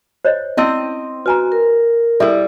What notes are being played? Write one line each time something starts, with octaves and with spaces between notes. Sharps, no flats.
C5 C#5 D#5
C4 C#4 E4 D#5 E6
F#4 B4 G#5 A#5
A#4
G3 E4 G#4 A4 E5